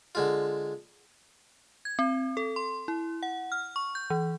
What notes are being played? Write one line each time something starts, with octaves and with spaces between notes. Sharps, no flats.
D3 G#3 F4
G#6
C4
A4
C6
E4
F#5
F6
C#6
G6
E3